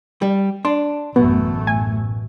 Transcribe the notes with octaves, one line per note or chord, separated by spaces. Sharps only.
G3
D4 C6
A1 F#2 B2 A3 B3
G#5